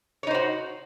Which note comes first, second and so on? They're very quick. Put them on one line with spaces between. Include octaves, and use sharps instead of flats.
C#5 D#4 C5 F#4